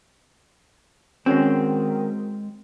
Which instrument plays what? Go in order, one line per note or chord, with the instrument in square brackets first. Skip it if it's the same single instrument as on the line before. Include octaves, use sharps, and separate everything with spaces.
[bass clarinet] D#3 [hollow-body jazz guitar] G#3 C4 [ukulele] C#4 F#4 C#5